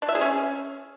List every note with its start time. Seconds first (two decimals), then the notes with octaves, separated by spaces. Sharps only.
0.02 D4
0.09 E5
0.15 G#4
0.21 C#4